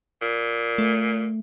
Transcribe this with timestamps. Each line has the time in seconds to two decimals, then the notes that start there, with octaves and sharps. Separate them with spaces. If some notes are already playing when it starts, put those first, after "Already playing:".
0.22 A#2
0.78 A3